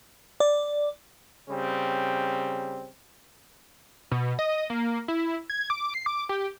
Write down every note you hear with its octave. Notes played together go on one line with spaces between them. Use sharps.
D5
C#3 G3 C4
B2
D#5
A#3
E4
G#6
D6
C7
D6
G4